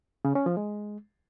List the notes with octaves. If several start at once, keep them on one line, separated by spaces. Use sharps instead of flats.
C#3
C#4
F3
G#3